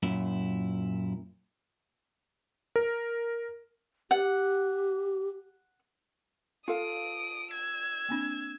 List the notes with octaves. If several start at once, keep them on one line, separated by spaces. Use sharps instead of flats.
F#2 A#2 E4
A#4
G4 F#5
F4 A4 F5 D#6 D7
E6 G#6
A#3 C4 D4